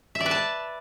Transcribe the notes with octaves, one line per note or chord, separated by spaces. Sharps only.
E5
D5
B4
A5